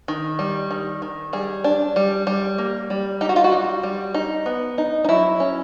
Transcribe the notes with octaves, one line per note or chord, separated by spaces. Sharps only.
D#3
G3
D#3
D#3
G3 G#4
D4
G3
G3
A#3
G3
D#4 G4
F#4
F4
F#4
G3
G3
D#4
B3
D#4
D#4
F#3 E4
C#4